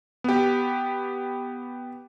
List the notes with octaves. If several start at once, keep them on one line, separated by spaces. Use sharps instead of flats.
B3 G4